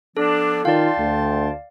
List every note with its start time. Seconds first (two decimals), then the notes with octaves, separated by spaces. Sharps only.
0.17 F3 B3 D4 A4
0.65 D#3 F4 D5 F5 G5 A5 C6
0.99 D2